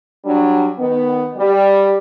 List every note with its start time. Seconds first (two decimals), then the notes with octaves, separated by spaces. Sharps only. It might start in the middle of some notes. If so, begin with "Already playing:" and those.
0.24 F#3 G3 D4
0.78 D#3 B3
1.37 G3